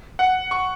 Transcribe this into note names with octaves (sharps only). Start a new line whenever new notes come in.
F#5
C#6